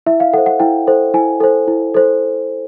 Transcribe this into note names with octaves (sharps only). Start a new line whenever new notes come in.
E4 E5
F5
A4 C5 F#5
F#5
E4 G5
A4 C5
E4 G#5
A4 C5
E4
A4 C5